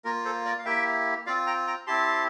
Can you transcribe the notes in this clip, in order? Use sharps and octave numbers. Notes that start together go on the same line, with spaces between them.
A#3 F4 A#4
A4 C5
A#4 D5
F5
A#3 E4 G4 E5 G5
C4 F4 D5 F5
G5 A#5
G5 A#5
C4 E4 G4 A5 C6